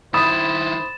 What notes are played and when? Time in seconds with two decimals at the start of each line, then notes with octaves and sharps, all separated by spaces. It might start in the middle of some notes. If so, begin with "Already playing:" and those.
0.14 D#3 E4 C5 B5 D#6 A6 E7